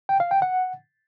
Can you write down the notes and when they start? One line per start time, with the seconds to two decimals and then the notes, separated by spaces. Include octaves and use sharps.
0.09 G5
0.20 F5
0.31 G5
0.42 F#5